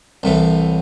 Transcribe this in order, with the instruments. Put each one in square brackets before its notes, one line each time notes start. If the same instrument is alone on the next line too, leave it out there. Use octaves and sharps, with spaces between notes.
[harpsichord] C2 A2 E3